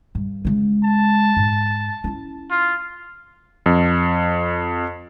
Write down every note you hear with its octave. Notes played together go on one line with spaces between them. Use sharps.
G2
C#3 G#3
A5
G#2
C#4 E4
F4
F2